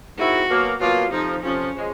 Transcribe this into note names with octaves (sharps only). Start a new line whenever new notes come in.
D#3 G#3 C4 E4 F#4
B2 F#3 A#3
B2 F#3 A#3 F4
F2 C3 F3 D#4
F2 C3 F3 C#4
C#3 F3 G#3 C#4